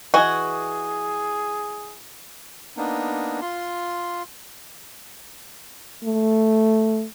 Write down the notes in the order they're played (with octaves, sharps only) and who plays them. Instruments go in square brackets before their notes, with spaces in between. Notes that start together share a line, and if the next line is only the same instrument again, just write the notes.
[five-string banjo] E3 D#5 G#5 [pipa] F#4 [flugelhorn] G#4
[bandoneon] A#3 B3 D4 D#4
F4 C6
[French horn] A3